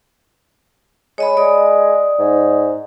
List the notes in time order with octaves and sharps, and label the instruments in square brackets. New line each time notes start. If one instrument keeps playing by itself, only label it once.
[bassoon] G#3 [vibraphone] C#5 D#5 B5
[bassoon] G#3 [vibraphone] D5 D#6
[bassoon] G#2